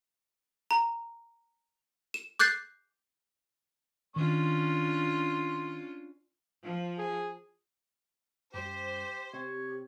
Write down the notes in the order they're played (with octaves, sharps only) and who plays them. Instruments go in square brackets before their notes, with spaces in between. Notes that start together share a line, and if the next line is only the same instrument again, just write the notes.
[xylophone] A#5
E7
D6 F#6 G6 A6 C7
[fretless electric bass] D#3 [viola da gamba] C#4 D4 F4 [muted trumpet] C6
[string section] F3
[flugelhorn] G#4
[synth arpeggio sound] F#2 G3 [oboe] G4 [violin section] C5
[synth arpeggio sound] C3 C4 [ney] G4 [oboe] C#5